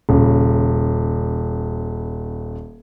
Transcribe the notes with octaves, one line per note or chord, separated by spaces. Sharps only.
D#1 C#3